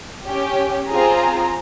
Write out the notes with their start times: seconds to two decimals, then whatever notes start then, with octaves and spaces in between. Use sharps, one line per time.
0.25 C#4 G4
0.88 C4 F4 G#4 A#5